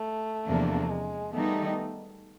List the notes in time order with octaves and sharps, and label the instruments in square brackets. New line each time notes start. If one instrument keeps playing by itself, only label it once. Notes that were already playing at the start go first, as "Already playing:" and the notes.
Already playing: [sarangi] A3
[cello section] E2 C3 F3 A#3 D4
[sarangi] G#3
[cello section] D#3 G3 B3 D#4 [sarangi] A3